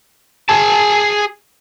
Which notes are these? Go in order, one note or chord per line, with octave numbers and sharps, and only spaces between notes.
G#4 A5